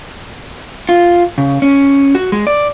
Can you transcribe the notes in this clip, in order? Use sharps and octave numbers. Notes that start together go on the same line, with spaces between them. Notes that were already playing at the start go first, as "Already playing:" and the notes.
F4
C#3
C#4
F#4
G#3
D5